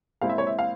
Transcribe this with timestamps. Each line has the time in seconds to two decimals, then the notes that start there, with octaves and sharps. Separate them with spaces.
0.21 A#2 G#3 C4 E4 F5
0.30 E5
0.38 C#5
0.47 E5
0.59 F5